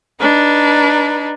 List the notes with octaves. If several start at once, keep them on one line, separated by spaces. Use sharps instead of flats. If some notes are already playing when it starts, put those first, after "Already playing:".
D4 D#4 B4